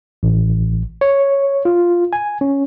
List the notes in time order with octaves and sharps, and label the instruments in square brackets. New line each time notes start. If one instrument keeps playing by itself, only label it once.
[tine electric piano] A1
C#5
F4
G#5
C#4